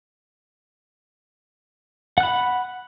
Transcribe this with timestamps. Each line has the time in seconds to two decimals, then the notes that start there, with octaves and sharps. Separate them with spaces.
2.18 F#5
2.20 F#6
2.23 B5